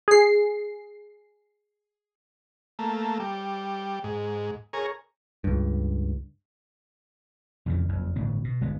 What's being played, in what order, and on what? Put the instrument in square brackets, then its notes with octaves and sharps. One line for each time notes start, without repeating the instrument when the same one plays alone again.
[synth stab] G#4 C7
[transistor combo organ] A3 A#3
G3
G#2
G#4 A#4 C#5
[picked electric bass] C#2 G2
[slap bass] F2 C#3 E3
F#1 F2
G1 A2 E3 B3
B2
G1 G#3 B3